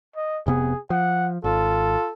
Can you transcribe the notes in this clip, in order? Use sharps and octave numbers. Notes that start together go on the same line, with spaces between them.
D#5
F1 C3 B3 G#4
F3 F#5
G#1 F4 A4